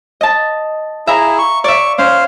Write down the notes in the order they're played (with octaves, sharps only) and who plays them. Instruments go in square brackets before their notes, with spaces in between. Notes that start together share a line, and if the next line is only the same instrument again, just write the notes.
[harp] D#5 A5
[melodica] E4 G#4 [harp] E5 A#5
[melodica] C#6
[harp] D5 E5 [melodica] C#6
[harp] C#4 [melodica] C5 F5